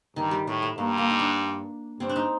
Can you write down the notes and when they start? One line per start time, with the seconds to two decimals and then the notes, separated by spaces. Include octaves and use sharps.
0.16 G2 D#3
0.31 G3
0.47 A2 G3
0.62 A3
0.78 G2 A#3
0.98 A#3
1.10 D#4
1.19 D4
2.00 G2 C4
2.09 D4
2.16 D#4